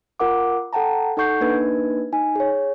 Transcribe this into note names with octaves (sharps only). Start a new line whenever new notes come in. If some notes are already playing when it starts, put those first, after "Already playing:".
F4 A#4 F#5 D6
A4 F#5 G5 A5 A#5
D#4 A4 F#5 C#6 G6 C7
A#3 D4 D#4 B4 G#6
D#4 G#5
G#4 C#5